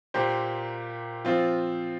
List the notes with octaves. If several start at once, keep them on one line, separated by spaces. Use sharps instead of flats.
A#2 A#3 G4 C5
F3 C4 F4